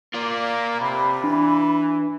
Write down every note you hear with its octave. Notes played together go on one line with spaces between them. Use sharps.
A#3 F4 D5
C3 B5
E3 D4